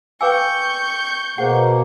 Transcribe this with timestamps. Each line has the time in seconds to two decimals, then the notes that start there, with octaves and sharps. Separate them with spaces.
0.21 B4 F5 G5 G#5 C#6 D6 E6 G6
1.38 B2 A#3 G#4 C5 F#5